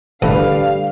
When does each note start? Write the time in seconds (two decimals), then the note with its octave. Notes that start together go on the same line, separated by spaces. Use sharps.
0.22 A1 D3 G3 A4 B4 F5